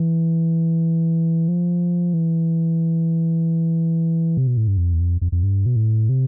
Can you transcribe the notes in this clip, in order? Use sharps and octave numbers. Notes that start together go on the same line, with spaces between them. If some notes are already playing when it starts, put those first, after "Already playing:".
Already playing: E3
F3
E3
C3
B2
A2
G2
F2
E2
F2
F2
F2
G2
B2
A2
C3